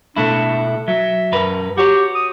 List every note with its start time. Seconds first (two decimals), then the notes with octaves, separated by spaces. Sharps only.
0.16 B2 A3 D4 E4
0.88 F#3 E5
1.32 F#2 A#4 B4
1.78 F#4 G4 C#5
2.15 D#6